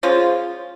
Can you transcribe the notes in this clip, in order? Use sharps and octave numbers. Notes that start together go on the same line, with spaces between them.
F3 G#3 C#4 F4